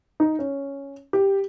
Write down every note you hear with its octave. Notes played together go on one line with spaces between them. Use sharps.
D#4
C#4
G4